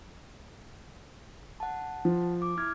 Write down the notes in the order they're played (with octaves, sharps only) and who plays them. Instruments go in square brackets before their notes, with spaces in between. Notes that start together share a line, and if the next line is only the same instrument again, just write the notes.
[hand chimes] F#5 A5
[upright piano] F3
[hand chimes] D6
E4 F6 G#6